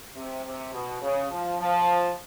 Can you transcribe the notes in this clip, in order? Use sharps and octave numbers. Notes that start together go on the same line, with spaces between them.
C3
C3
B2
C#3
F3
F3